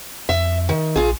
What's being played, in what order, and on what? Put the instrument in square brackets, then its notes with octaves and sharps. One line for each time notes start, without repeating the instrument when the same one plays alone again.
[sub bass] F2 [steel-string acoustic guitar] E5
[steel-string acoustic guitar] D#3
[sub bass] A#1 [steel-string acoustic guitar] F4 G#4